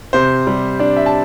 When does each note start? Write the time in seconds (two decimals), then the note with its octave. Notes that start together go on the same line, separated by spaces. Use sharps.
0.13 C3 C5
0.47 G3
0.79 D4 D5
0.97 E5
1.06 A5